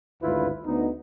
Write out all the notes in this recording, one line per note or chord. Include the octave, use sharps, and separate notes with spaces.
G#1 D2 G2 E4 F4 B4
D2 B3 D#4